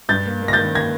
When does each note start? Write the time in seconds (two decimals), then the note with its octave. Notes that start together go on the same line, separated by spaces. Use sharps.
0.09 G2 G6 A6
0.26 A#3
0.42 A#3
0.48 A#6
0.53 D#3 G6 A6
0.75 A#3 G#6 A#6